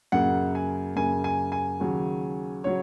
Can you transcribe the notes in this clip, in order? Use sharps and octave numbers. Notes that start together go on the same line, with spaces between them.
F#2 C#3 A#3 F#5
G#5
F#2 C#3 A#3 G#5
G#5
G#5
D#2 C#3 F#3
C#3 F#3 C#5